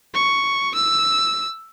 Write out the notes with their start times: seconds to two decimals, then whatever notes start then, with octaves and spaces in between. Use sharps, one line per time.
0.14 C#6
0.75 E6